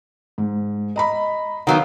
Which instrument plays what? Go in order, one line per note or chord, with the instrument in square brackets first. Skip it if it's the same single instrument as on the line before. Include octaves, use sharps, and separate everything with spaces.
[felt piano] G#2
D#5 A#5 B5
[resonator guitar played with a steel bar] D#3 F#3 B3 [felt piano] F5